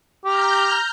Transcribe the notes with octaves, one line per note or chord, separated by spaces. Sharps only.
G4 A#5 F6 G6